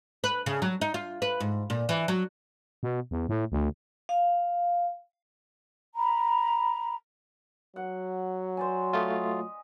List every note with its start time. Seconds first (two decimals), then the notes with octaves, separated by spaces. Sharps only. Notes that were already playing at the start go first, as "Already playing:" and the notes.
0.24 B4
0.46 C#3
0.62 F#3
0.81 D#4
0.94 F4
1.22 B4
1.40 G#2
1.70 A#2
1.89 E3
2.08 F#3
2.83 B2
3.11 E2
3.29 A2
3.52 D2
4.09 F5
5.96 A#5 B5
7.76 F#3 F#5
8.57 C5 D5 G#5
8.93 A3 F4 D#5 B5